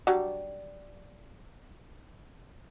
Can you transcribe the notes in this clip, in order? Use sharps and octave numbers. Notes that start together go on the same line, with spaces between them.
F#3 G3 D4